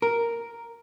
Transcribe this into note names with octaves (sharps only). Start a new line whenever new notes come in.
A#4